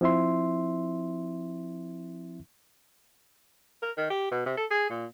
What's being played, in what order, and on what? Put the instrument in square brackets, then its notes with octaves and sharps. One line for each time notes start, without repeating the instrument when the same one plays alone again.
[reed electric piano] F3 C4 E4 E5 C6
[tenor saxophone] A#4
D#3
G4
B2
C3
A4
G#4
A#2